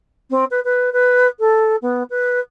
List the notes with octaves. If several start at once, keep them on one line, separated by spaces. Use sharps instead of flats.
C4
B4
B4
B4
A4
B3
B4